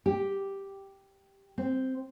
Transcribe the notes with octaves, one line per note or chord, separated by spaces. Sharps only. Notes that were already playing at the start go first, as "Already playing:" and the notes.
G4
C4